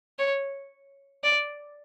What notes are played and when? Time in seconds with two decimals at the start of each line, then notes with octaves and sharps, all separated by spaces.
0.19 C#5
1.23 D5